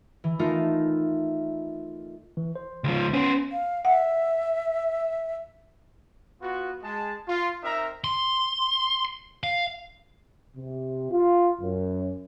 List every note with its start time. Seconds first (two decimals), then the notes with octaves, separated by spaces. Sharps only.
0.24 E3
0.39 A3 D#4 F4 A#4
2.37 E3
2.55 C5
2.84 C#2 F3
3.13 B3 C#4 C5
3.52 F5
3.85 E5 F#5
6.41 B3 F4 F#4
6.83 G#3 A5
7.28 F4
7.63 C4 D#4 A#4 E5 A#5
8.04 C6
9.44 F5
10.56 C3
11.11 F4
11.61 F#2